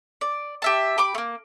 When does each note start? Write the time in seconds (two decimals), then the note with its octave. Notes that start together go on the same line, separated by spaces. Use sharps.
0.21 D5
0.62 G4 E5 A5
0.98 G4 B5 D6
1.15 A3 A#3